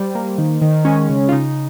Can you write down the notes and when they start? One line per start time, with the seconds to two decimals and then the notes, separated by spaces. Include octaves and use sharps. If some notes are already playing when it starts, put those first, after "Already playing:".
Already playing: G3 C5
0.15 A#3
0.38 D#3
0.62 D#3
0.85 G#3 C#4
1.09 C#3
1.29 F4
1.32 C#3 D#4